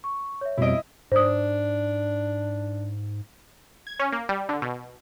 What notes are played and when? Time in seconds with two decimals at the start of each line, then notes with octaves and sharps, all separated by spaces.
0.04 C#6
0.41 C#5 E5
0.58 F2 B2 G3 C4 E4 D#5 D7
1.12 G#2 D4 C5 D#6
3.87 G#6
3.99 C#4
4.12 A#3
4.29 G3
4.49 D3
4.62 B2